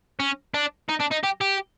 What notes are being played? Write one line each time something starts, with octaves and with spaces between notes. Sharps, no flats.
C#4
D4
D#4
D4
D#4
G4
G4